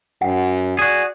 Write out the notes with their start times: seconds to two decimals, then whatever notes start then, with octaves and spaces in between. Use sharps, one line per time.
0.22 F#2 F#5
0.79 F#4 G#4 D5